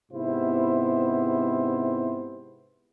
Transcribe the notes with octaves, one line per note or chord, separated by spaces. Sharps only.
G#2 C3 B3 E4 C5